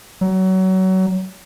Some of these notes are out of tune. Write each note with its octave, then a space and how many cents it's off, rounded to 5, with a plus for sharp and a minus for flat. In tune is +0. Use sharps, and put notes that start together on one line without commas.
F#3 +25